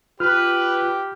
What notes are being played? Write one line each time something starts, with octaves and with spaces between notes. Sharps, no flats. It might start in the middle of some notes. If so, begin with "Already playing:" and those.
F4 G4 B4 F6